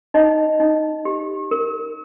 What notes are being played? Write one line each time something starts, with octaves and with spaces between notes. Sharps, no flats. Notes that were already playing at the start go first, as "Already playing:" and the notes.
D#4 D#5
D#4
G4
A#4